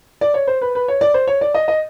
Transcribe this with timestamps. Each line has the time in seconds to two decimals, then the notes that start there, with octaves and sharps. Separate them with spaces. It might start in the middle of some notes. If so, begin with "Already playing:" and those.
0.21 D5
0.34 C#5
0.47 C5
0.61 B4
0.75 B4
0.88 C#5
1.01 D5
1.14 C5
1.27 C#5
1.41 D5
1.54 D#5
1.68 D#5